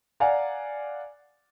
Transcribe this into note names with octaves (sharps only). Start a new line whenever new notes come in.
D5 F5 F#5 G#5 A#5